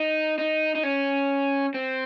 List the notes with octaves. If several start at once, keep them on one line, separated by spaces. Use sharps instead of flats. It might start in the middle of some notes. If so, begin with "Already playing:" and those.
Already playing: D#4
D#4
D#4
C#4
C4